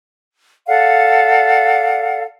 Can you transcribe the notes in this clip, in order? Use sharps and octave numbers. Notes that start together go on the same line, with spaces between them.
A4 D5 F5 F#5